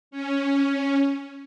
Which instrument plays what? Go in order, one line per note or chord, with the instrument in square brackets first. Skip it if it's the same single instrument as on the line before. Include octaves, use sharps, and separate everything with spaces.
[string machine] C#4